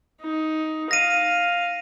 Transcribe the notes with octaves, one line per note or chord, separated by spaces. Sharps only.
D#4
F5 A#6 D#7